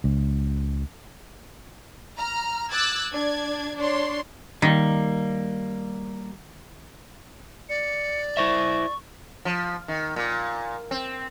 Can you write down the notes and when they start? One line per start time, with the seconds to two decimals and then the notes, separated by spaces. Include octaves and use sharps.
0.04 C#2
2.17 A#5 F6
2.71 D6 E6 F#6 G#6 A6
3.12 D4 D5 G#6
3.77 D4 C#5 C6
4.62 D#3 G3 A#3
7.69 D5 C#7
8.37 E4 C5 E5 C#6 A#6
9.45 F3
9.88 D#3
10.16 A#2
10.91 C4